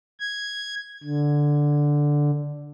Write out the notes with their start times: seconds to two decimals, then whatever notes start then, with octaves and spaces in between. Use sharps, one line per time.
0.20 G#6
1.03 D3